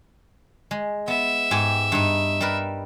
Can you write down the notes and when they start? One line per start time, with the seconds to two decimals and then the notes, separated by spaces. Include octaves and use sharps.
0.71 G#3
1.08 B3 E5
1.51 G#2 G4 G#5
1.92 G2 D#4
2.40 G3 A#4 B4